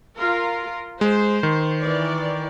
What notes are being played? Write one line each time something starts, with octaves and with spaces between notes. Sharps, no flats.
F4 A#4
G#3 C5
D#3
E3 D5